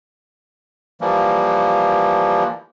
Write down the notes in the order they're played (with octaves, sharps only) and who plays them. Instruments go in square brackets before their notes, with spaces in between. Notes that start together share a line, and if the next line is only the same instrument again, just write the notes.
[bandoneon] E3 F3 G3 A#3